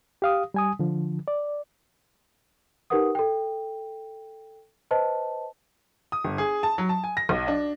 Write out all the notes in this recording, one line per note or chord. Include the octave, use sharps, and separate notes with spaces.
G4 F5 D#6
G3 G#5 D#6
D3 F3
D5
D#4 G4 A#4 B4 F#5 D#6
A4 G5
B4 C5 D#5 A5
D#6
G1
G#4
A5
F#3
A5
G#5
A#6
B1
D4